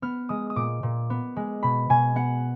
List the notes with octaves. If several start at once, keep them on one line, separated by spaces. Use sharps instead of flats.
B3 F6
G#3 D#6
D#6
A#2 D6
A#2
B3
G#3
B2 B5
B2 G#5
B3 F#5